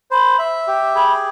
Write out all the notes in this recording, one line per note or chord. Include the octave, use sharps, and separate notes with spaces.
C5 B5
E5
G4
G#4 B5